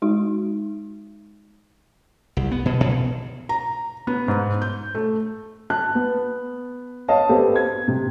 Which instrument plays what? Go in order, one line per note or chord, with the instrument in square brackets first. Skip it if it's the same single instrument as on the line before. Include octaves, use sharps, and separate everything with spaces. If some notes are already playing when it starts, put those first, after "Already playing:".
[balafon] G#3 D#4 F#4
[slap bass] C2
B3
B2
B2
[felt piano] A#5
B3
G#2
G6
A3
[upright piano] A5 F#6
B3
C#5 D#5 F5 A5
B3 C4 G4 A4
G#6
C3